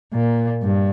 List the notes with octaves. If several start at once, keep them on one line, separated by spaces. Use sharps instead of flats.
A#2
G2